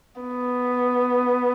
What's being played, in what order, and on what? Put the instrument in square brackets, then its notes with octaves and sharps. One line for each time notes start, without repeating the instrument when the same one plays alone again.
[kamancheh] B3